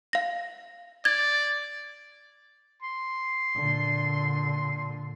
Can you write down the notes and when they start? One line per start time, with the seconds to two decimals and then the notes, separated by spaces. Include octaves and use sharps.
0.13 F5 A#6
1.05 D5 G#6
2.83 C6
3.56 A#2 D3